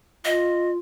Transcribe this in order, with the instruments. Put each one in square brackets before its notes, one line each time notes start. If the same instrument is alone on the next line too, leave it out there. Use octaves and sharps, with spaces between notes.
[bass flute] F4 [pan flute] D#5